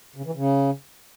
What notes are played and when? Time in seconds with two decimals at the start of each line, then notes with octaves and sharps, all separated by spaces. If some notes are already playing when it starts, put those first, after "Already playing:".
0.16 C#3
0.25 E3
0.35 C#3